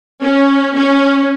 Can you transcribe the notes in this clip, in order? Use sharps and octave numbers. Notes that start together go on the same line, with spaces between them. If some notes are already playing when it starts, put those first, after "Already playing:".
C#4
C#4